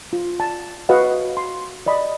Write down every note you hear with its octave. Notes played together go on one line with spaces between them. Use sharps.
F4
A5
F#4 B4 D#5 F5 F#5
C6
D5 D#5 B5